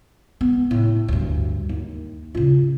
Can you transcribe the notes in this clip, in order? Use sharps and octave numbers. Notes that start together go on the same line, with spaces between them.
B3
A2
D2 G2
D#2
C#3 F4